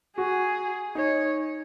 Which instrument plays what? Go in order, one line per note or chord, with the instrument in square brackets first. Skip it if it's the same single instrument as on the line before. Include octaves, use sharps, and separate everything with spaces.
[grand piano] F#4 [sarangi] G#4
[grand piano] D#4 [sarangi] C#5